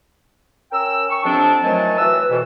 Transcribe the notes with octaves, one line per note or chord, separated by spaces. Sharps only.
C#4 A#4 G5 E6
C#6
F2 C3 F3 C4 D4
D#3 F3 F#3 A3 G#5 A5
E3 F#3 B4 E6
F2 B2 E3